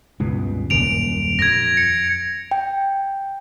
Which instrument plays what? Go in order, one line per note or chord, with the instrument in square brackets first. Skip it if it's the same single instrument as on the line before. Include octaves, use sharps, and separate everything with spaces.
[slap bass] C#2 G2 B2
[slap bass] D#1 F#2 [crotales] D7 F7
[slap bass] F2 [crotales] G#6 A#6
[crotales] C#7
[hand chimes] G5